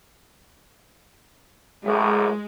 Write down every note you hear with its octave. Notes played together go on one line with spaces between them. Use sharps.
A1 F#2 A2 G#3